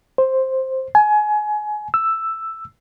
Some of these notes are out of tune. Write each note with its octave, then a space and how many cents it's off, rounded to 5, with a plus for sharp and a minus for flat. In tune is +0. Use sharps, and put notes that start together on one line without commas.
C5 +5
G#5 +25
E6 +5